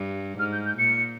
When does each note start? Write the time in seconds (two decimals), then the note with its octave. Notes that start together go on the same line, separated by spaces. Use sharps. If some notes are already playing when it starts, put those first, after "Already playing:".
Already playing: G2
0.39 G#2 F6
0.52 G6
0.65 G6
0.78 A#2 C#7